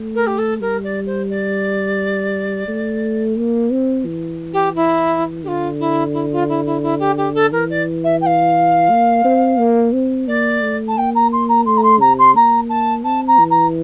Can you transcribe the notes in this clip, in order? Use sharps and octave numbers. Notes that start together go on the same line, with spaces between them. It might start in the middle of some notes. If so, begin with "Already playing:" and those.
Already playing: A3
A#4
G4
A4
G3 A#4
D5
C5
D5
A3
A#3
C4
E3
G4
E4
D3 F4 G4
E4
E4
F4
E4
E4
E4
G4
G4
A4
E3 A#4
D5
E5
G5
F5
A#3
C4
A#3
C4
A#3 D5
A3
A5
A#3 G5
A#5
C6
A#5
A3 C6
A#5
C6
C3 A#5
C6
A#3 A#5
A5
C4 A5
A#5
E3
A#5